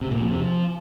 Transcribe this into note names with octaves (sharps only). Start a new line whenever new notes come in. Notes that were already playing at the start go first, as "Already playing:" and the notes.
C3
A#2
F2
C3
F3